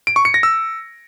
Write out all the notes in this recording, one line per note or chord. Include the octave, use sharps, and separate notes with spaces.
D7
C#6
C#7
A#6
E6